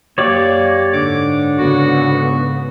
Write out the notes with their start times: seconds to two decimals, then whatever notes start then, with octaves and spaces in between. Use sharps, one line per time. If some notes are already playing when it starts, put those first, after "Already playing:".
0.18 F#2 A#3 G4 C#5 D5
0.93 G#2 D3 D6
1.57 G#2 C#3 B3 F#4